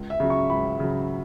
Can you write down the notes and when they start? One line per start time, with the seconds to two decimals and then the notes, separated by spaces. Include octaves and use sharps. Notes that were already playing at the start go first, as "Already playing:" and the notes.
Already playing: C#2
0.10 E5
0.20 C#3 F#3
0.30 C#6
0.50 C#2 B5
0.80 C#3 F#3